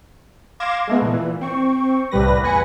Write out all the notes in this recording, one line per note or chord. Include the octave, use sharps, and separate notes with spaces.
F5 C6 D6 G#6 A#6 E7
G#3 A3 B3
A#2 E3
C4 C#6
C2 A2 G3 B4 A#6
E2 B4 G#5 A#6 C#7